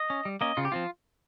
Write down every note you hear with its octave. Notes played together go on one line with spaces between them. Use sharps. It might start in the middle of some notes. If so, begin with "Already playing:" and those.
Already playing: D#5
C#4
G3
A#3 C#4 D#5
C#3 F4
G4
F3 C4 F4